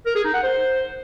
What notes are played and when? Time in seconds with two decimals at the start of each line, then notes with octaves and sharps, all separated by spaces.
0.06 A#4
0.16 G#4
0.25 D#4
0.34 F#5
0.43 C5